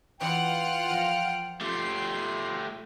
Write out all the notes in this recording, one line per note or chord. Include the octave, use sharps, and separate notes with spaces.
E3 F4 B4 C#5 F#5 G5 F6
F3 A#4
A3 F4 G4 G#5 C7